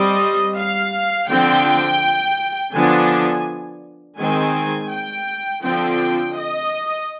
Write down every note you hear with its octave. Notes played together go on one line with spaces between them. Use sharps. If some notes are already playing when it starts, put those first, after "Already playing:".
Already playing: G3 C4 D#5
F5
D3 F3 C4 G5
D3 F3 B3 D4 G#5
D#3 G#3 C4 G#5
G5
D3 F3 C4 G5
D#5